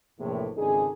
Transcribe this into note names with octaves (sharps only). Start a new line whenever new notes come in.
A#1 E2 A2 C3
G#1 C#2 D3 D4 D#4 G#4